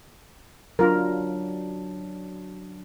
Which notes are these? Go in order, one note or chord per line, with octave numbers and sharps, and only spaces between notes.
F#3 D4 F4 A#4